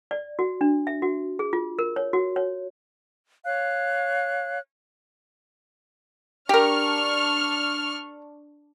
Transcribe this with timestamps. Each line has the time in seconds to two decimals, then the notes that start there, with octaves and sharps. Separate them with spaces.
0.11 D5
0.39 F#4
0.61 D4
0.87 E5
1.02 F#4
1.39 G#4
1.53 F4
1.79 A#4
1.96 C#5
2.13 F#4
2.36 C#5
3.45 C#5 F5 F#6
6.49 D4 G4 A#4 C#6 F6